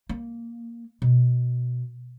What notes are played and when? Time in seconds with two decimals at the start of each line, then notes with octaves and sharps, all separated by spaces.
0.09 A#3
1.02 B2